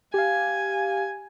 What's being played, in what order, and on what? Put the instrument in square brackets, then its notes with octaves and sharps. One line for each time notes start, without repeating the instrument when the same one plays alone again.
[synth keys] G4 F5 [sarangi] G#5